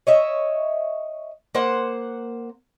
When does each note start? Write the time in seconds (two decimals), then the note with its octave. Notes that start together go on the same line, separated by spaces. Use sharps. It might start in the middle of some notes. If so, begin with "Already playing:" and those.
0.07 C#5 D#5 E5
1.55 A#3 C5 F#5